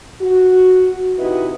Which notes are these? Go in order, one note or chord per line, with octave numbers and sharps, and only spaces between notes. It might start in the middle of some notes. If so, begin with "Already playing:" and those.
F#4
C3 D#4 E4 F#4 B4 D#5